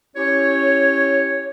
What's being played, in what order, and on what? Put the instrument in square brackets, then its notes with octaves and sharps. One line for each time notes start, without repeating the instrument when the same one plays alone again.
[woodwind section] C#4 E4 G4 C#5